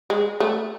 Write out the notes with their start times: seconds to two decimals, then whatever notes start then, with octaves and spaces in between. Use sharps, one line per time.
0.10 G#3
0.40 A3